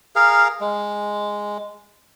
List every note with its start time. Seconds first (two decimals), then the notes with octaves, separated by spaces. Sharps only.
0.16 G#4 A#4 F5
0.61 G#3